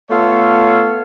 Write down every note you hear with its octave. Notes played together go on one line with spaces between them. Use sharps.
A3 B3 F4 A4 C#5 F5